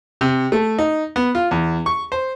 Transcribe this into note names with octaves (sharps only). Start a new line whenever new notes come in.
C3
A3
D#4
B3
F4
E2
C#6
C5